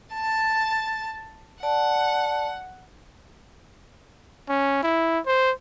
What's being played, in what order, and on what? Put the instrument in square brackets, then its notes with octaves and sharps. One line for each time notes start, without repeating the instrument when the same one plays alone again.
[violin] A5 A6
[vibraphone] D5 A5 [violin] F#5
[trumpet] C#4
E4
C5